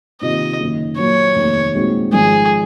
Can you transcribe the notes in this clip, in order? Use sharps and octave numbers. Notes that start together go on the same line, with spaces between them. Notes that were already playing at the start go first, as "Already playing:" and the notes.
C3 D#3 A#3 F4 D#5
F#1 F#2 D#3
A#2 F#3 A#3 C#5
F1 D#2 D#3
A#2 G#3 C4 D#4 F#4
G#1 G#2 F3 G#4